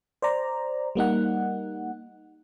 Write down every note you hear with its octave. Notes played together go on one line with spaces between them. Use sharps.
C5 D5 A#5
G3 A#3 D#4 F#5